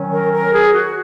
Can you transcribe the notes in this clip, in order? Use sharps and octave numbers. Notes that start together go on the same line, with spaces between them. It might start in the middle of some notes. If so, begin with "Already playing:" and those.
Already playing: D#3 F#3 C#4
A#4
A#4
G#4
F#4